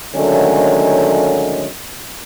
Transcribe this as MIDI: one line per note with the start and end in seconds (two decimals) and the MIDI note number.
0.15 1.68 50
0.15 1.68 51
0.15 1.68 54
0.15 1.68 56
0.15 1.68 57
0.15 1.68 61